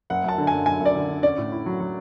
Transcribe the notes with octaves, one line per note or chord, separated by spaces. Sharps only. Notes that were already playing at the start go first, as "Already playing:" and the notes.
F#1 F#5
F#2 A5
D3
G#5
F#2
F#2 G#5
F#2
D5
D3
D3
C#4 D5
A2
E4
F#3
F#3